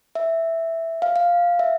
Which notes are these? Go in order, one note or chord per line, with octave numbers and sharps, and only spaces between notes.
E5
F5
F5
E5